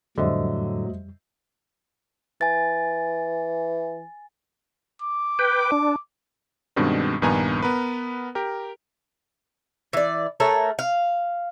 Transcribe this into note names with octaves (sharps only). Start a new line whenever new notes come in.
F2 A2 D3 F#3 G3 C5 D#5 E5
E3 G#5 A6
D6
B4 G5
D4
G2 B2 D#3 G#3 C4 D4
A#1 G2 D#3 B3 G#5 A#5
B3 A#4 B4
G4 A#4
E3 D5
A3 A4 A#4 C#5
F5